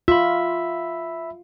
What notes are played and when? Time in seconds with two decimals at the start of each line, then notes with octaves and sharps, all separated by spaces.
0.08 F4 E5 B5